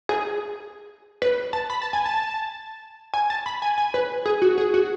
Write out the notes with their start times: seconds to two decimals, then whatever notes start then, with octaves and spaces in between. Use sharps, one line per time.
0.09 G#4
1.22 B4
1.53 A5
1.70 B5
1.82 A5
1.93 G#5
2.06 A5
3.14 G#5
3.30 A5
3.46 B5
3.62 G#5
3.78 G#5
3.94 B4
4.26 G#4
4.42 F#4
4.58 G#4
4.74 F#4